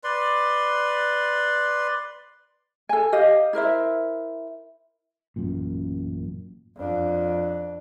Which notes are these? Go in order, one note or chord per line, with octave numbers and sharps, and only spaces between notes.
B4 D5 C6
A4 G#5
G4 D#5 F5
E4 A#4 C5 E5
A1 F#2 A#2
F2 D4